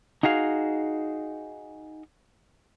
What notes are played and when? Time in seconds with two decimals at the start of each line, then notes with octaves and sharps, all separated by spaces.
0.23 D#4 F#4 G#4 F5